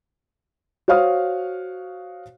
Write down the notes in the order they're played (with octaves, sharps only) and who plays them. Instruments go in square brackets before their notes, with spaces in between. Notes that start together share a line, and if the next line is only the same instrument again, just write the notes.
[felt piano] F#4 C5 C#5 F5 D#6 F6